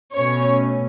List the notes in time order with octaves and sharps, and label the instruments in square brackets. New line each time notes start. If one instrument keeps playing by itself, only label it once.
[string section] B2 A3 C#4 C#5